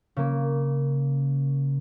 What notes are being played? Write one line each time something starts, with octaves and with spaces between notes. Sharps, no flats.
C#3 A#3